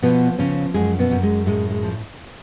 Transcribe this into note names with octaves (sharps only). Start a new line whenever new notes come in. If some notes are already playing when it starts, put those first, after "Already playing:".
B2 F3 B3
C#3 F3 C#4
F#2 G#3 G#4
B2 B3
F#2
G#3
A2 G#3
G#3
F3